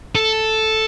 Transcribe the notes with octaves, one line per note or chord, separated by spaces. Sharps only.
A4